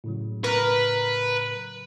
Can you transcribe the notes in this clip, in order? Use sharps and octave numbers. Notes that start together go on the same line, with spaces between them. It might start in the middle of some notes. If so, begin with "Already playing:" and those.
A2 C#3 F#3
A#4 B4